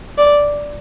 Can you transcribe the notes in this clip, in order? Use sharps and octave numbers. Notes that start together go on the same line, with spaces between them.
D5